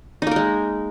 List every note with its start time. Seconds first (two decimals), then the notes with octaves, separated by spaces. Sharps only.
0.22 D#4
0.27 A#3
0.31 A#4
0.36 G#3